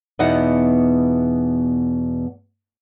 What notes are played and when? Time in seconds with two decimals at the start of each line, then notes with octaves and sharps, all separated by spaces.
0.19 E2 B2 B3 D#4 E4 F#5